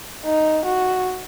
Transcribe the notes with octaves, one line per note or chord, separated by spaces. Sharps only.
D#4
F#4